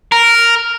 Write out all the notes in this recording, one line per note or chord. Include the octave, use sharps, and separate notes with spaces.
A#4